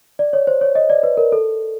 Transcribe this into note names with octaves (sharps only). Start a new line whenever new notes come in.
D5
C#5
C5
C#5
D#5
D5
B4
A#4
A4